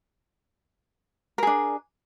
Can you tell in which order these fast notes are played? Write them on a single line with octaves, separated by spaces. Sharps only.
A#4 G#4 D4